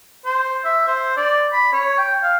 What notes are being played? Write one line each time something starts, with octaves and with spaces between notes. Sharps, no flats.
C5
E5
C5
D5
B5
C#5
G5
F5